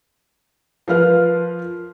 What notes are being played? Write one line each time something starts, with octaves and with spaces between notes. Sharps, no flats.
F3 F4 A#4 B4 F5 F6